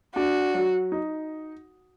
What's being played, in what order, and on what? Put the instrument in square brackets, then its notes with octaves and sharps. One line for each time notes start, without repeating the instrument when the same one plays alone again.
[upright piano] D4 [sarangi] F#4
[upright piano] F#3
D#4